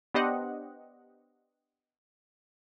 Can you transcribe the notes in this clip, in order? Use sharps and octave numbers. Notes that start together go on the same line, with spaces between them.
B3 D4 G4 C5 D#5 F#5